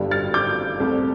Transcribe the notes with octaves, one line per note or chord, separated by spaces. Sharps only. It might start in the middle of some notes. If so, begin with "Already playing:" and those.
Already playing: G1 G2 D3 G3
F6 A6
D6 G6
C2 C3 A3